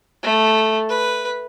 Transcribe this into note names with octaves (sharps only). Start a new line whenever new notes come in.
A3
B4